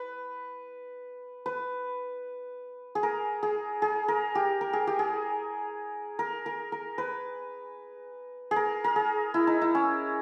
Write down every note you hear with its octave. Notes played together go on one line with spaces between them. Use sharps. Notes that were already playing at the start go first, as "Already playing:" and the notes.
Already playing: B4
B4
G#4
A#4
G#4
G#4
A#4
G4
A#4
G#4
G4
G#4
A#4
A#4
A#4
B4
G#4
A#4
A#4
G#4
E4
D#4
E4
C#4